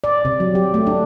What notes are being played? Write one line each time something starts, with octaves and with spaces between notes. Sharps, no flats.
D5
C3
F#3
G4
A3
D4